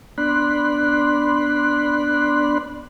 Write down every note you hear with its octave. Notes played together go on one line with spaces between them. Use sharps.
B3 D4 D5 B5 C6 F#6